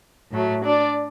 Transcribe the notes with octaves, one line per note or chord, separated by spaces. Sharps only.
A2 F#3 A3
D4 D5